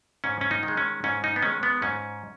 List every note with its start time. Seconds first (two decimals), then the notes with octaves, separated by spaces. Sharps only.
0.24 G#2 C#4
0.41 C#4
0.51 D#4
0.63 D#3
0.68 G#3
0.77 C#4
1.04 G#2 C#4
1.24 D#4
1.36 B3
1.42 D#3 G#3 C#4
1.63 B3
1.82 G#2 C#4